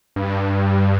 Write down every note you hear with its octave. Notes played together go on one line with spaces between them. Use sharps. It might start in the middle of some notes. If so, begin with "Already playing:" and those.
G2